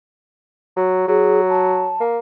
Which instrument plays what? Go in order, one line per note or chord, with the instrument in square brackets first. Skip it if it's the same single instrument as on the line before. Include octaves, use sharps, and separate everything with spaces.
[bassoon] F#3
[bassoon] F#3 [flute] G#4
[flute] A5
[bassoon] A#3